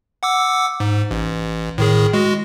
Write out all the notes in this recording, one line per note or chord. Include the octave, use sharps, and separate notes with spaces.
F#5 D6 E6
G#2
A1
A2 D#3 G#4
G#3 F#4